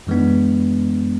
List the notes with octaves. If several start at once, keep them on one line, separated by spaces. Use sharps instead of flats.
F#2 E3 G#3 B3 D4